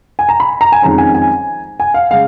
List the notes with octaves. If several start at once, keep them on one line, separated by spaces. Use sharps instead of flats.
G#5
A#5
B5
A#5
G#5
F2 D#3 G#3 C#4 A#5
G#5
G#5
G#5
F5
C#3 G#3 F5